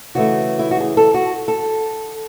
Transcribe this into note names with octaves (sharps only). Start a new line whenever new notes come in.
C#3 E3 A3 F#4
E4
F#4
G#4
A4
F#4
A4